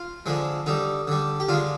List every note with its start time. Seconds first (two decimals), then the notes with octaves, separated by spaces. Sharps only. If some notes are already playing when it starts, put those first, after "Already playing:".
Already playing: F4
0.26 D3 F3 G#3
0.66 D3 G3 D#4
1.07 D3 G3
1.40 G4
1.49 D3 G#3 F4